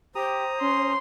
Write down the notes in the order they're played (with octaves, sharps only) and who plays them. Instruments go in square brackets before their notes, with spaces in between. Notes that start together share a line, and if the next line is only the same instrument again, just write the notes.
[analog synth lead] G4 [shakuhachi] C5 [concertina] A#5 D#6
[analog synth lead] C#4 [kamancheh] C6